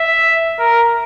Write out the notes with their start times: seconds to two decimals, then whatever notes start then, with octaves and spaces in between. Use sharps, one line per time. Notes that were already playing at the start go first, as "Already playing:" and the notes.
Already playing: E5
0.59 A#4